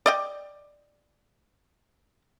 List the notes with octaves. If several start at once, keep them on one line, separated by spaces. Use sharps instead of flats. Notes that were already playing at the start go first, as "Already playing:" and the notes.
D5 D#5 G5